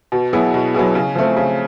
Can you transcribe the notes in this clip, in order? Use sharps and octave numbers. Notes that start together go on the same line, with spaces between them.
B2
F#3 B3 E4 G#4
B2
F#3 B3 E4 G#4
C#3
F3 A3 C4
C#3